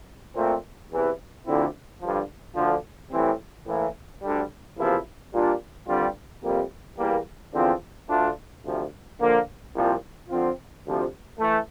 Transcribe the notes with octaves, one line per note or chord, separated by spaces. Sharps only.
A#2 A3 C4
E2 C3 E3
D2 D3 F3 C4 E4
G2 D3 F3
D2 D3 F3
A2 E3 G3 C4
A2 E3 A#3 E4
D2 D3 G3
E2 C3 F3 A#3 E4
A#2 G3 D4 F4
G2 D3 G3 C4 F4
F2 C3 G3 A#3
E2 E3 G3 A#3
E2 D3 F3 C4 F4
D2 D3 A3 D4 F4
D2 C3 F3
D3 F3 A#3
C2 A#2 F3 C4
D3 F3 C4 F4
D2 C3 F3
E3 A3